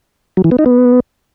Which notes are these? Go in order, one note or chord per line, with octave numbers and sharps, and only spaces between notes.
F#3
E3
B3
D#4
B3